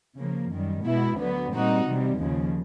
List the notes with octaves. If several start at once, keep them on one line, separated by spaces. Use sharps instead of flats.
C#3 F3 A#3
F#2 D#3 G3
B2 G#3 B3 E4
D2 D3 F#3 B3
A#2 G3 C4 D#4 F#4
C3 E3 G3
D#2 C#3 F3